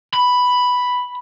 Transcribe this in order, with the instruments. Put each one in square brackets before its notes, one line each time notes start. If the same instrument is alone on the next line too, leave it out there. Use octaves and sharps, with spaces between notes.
[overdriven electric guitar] B5